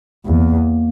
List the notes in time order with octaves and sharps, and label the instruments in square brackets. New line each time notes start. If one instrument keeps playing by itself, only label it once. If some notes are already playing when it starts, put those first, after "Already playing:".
[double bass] E2 [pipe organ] A#3